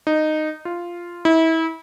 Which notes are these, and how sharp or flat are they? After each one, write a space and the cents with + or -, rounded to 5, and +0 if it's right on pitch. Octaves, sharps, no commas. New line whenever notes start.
D#4 -10
F4 -5
E4 -30